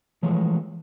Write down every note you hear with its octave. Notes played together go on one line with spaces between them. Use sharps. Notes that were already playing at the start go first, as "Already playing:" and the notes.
E3 F3 G#3 A3 C#5